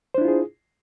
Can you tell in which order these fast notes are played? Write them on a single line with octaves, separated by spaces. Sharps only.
C5 D4 E4 F4 G#4